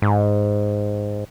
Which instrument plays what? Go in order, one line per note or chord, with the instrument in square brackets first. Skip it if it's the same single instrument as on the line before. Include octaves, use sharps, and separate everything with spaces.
[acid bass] G#2